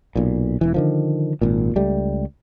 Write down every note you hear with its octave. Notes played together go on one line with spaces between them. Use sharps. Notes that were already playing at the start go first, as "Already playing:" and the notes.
B1 A#2
E1 E3
D3 D#3 F3
G#1 A#2
C#2 G3 A3